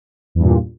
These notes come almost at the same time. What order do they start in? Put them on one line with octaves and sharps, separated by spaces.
E2 G2 A#2